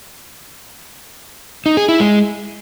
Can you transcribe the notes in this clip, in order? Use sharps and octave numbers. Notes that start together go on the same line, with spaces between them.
D#4
G#4
E4
G#3